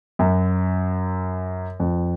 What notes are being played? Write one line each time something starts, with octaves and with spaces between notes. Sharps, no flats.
F#2
F2